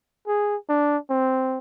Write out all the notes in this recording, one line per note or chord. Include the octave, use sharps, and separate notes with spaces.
G#4
D4
C4